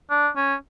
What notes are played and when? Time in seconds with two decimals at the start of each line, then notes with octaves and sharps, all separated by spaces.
0.10 D4
0.36 C#4